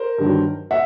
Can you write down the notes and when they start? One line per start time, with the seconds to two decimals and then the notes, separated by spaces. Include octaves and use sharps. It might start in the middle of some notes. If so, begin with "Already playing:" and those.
Already playing: A#4 C5
0.18 G2 D#3 F#3
0.71 E5 F#5